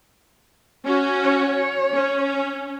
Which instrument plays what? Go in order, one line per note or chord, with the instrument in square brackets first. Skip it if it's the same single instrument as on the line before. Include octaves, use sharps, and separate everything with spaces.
[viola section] C#4 F#4
[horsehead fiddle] C#5
[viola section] C#4